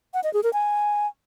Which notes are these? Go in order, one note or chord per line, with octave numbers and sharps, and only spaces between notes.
F#5
D#5
G#4
A#4
G#5